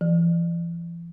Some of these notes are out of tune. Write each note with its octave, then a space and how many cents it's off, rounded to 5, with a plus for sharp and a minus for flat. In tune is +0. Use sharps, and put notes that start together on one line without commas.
E3 +45